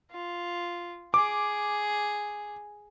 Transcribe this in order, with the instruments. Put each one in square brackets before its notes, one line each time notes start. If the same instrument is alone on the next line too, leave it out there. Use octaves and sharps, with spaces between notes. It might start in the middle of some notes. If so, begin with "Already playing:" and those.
[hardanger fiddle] F4
[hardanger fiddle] G#4 [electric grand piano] D6